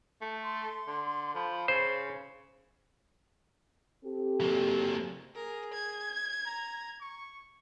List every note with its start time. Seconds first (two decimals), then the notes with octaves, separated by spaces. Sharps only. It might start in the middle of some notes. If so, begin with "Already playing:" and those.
0.21 A3
0.44 C6
0.87 D3
1.35 F3 B5
1.68 C#3 C5
4.05 C4 G4 A4
4.41 F#3 A#3
5.35 G#4 A#4
5.74 G#6
6.46 A#5
7.01 C#6